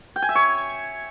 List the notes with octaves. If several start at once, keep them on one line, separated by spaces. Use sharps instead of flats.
G5
G#5
E5
C#5